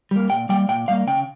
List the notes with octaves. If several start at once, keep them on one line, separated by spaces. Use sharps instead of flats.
G3 A#3
A#2 G5
G3 A#3 G5
A#2 G5
G3 A#3 F5
C#3 G5